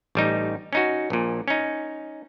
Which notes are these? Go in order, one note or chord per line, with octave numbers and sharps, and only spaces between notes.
A1 G3 D#4
C#4 D#4 F#4
A#1 A#2
C#4 D#4